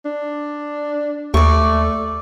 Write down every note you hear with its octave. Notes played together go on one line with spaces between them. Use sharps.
D4
D#2 A3 D5 C#6